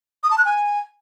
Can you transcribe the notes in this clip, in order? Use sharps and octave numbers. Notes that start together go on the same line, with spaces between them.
D#6
A5
F#6
G#5